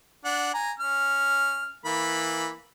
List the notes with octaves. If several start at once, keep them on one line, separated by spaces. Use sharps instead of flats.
D4 F#5
G#5 A#5
C#4 F6
E3 A#3 B5